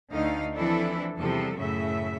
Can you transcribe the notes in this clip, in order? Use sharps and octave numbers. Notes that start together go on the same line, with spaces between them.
D2 D3 A3 D#4 F5
E3 F3 C4 D4 E4 A4
E2 C3 F3 G3 A4
F#2 A2 C#3 F#3 E5